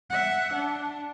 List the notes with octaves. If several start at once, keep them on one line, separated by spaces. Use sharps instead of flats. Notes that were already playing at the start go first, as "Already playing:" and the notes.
E5 F#5
D4